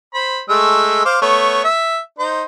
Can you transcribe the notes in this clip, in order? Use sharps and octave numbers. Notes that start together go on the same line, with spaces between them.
C5 B5
G#3 A3 E6
C5 F5 D6
A3 B3 C#5
E5
D#4 C5